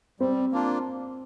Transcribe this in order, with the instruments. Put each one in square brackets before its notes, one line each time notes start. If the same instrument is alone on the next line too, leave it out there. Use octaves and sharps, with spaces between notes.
[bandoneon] G3 [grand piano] C4 C5
[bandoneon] A#3 D4 F4